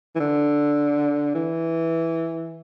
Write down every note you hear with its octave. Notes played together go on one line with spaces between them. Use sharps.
E3
D3
E3